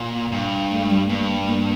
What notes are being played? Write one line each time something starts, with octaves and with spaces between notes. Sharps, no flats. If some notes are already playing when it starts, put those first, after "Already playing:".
Already playing: A#2
G2
A3
G3
G2 A#3
A#3